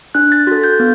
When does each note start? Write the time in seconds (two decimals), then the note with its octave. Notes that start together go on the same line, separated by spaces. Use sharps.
0.15 D4 F#6
0.32 A6
0.47 F#4 A6
0.52 A4
0.64 G6
0.80 B3